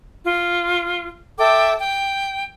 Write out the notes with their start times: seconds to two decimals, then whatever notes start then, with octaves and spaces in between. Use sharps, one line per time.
0.24 F4
1.38 A4 E5 G5 D6
1.79 G5